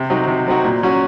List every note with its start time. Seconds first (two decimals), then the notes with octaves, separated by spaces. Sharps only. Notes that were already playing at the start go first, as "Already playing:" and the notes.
Already playing: C3
0.10 F#3 C4 D#4 F#4
0.28 C3
0.46 F#3 C4 D#4 F#4
0.64 A#2
0.83 F#3 C#4 F#4